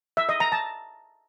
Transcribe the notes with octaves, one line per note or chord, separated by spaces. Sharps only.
E5
D#5
A#5
A5